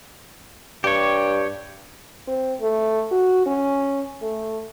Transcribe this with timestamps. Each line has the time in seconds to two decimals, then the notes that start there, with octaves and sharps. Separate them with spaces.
0.84 G2 G4 C#5
2.28 C4
2.60 A3
3.11 F#4
3.46 C#4
4.22 A3